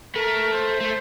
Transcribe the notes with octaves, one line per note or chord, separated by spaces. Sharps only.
A3 A#4
C5
A3